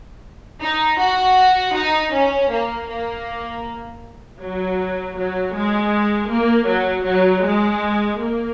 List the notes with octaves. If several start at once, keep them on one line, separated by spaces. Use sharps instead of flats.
D#4
F#4
D#4
C#4
A#3
A#3
F#3
F#3
G#3
A#3
F#3
F#3
G#3
A#3